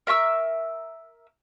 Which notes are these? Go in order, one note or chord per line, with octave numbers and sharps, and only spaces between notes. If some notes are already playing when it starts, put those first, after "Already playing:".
A#4 E5 C#6 E6